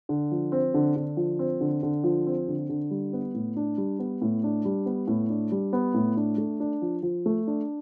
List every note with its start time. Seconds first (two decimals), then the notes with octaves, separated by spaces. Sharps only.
0.09 D3
0.31 F3
0.52 C4
0.74 D3
0.96 D3
1.17 F3
1.39 C4
1.61 D3
1.83 D3
2.04 F3
2.27 C4
2.48 D3
2.69 D3
2.91 G3
3.13 B3
3.34 A2
3.56 D4
3.78 G3
3.99 B3
4.22 A2
4.43 D4
4.65 G3
4.86 B3
5.08 A2
5.30 D4
5.52 G3
5.73 B3
5.94 A2
6.17 D4
6.38 A3
6.60 D4
6.82 F3
7.03 F3
7.26 A3
7.47 D4